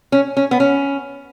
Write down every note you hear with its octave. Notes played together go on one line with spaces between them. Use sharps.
C#4
C#4
B3
C#4